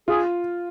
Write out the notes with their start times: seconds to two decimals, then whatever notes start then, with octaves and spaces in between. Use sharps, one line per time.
0.07 F4 G#4